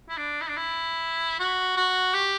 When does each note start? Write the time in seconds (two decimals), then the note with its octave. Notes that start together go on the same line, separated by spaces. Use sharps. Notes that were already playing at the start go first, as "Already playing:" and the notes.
0.09 E4
0.17 D4
0.41 E4
0.49 D4
0.57 E4
1.39 F#4
1.76 F#4
2.14 G4